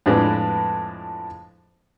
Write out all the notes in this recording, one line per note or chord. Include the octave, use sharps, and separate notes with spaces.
F2 A2 G#3 D4 B4